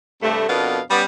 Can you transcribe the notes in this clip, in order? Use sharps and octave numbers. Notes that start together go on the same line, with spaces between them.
G2 C3 A3
F2 B2 B3 D4 A#4 F5
G3 B3 C#4